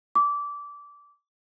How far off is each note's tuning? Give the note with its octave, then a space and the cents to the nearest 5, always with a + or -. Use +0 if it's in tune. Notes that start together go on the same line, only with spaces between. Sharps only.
D6 -20